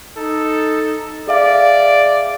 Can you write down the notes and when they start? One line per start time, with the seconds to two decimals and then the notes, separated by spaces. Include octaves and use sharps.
0.16 D#4 A4
1.27 G#4 D5 E5 F5